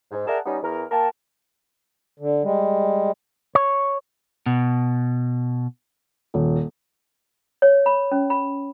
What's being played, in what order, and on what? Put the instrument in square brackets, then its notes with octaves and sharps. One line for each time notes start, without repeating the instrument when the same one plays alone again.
[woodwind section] G#2
G#4 A#4 D5 E5 F#5 A5
G3 B3 C#4 D#4
E2 A#4
A#3 A#4 G5 A5
[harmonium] D3
G3 G#3
[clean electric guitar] C#5
B2
[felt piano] D#1
[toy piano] C#5
B5
C#4
B5